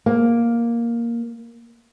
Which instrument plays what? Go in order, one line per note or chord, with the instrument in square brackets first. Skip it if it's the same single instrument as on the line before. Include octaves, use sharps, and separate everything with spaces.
[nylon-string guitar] A#3